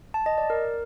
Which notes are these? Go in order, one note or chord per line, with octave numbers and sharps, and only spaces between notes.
A5
D#5
D5
A#4